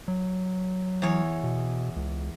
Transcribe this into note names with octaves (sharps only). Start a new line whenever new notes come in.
F#3
E2 C#5
B2
C#2